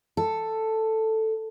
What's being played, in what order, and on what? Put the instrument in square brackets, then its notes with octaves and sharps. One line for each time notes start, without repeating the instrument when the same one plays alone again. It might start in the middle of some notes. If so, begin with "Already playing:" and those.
[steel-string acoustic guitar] A4